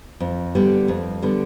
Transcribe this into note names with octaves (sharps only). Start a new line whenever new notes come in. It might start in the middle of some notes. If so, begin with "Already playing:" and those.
F2
D3 G3 B3
F2
D3 G3 B3